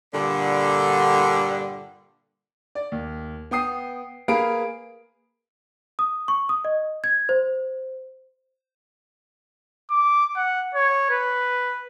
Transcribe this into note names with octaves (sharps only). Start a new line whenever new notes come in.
G2 A#2 D3
D5
D#2
B3 G5 D#6 C7
A#3 G#4 B4 F5 B5 D7
D#6
C#6
D#6
D#5
G#6
C5
D6
F#5
C#5
B4